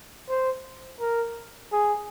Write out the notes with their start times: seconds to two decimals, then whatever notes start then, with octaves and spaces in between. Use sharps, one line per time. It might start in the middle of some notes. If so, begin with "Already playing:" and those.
0.29 C5
1.00 A#4
1.72 G#4